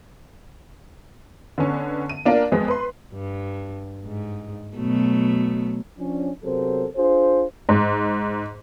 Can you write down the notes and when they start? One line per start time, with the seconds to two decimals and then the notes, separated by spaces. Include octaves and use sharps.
1.58 D3 B3 C#4
2.09 D#7
2.25 A#3 D4 F4 A#4
2.52 F2 G#3 B3
2.68 B4 C6
3.13 G2
4.06 G#2
4.77 B2 F#3 A3
5.99 F3 C#4 D4
6.43 C3 F#3 B3 A4 A#4 C5
6.96 D4 F4 G#4 C5
7.69 G#2